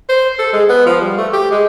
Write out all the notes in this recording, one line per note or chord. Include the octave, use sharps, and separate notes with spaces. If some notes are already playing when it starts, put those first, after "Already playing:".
C5
A4
G#3
B3
F3
G3
A3
G4
G#3